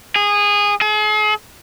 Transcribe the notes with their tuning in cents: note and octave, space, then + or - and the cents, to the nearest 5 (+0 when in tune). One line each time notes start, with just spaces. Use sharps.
G#4 -20
G#4 +40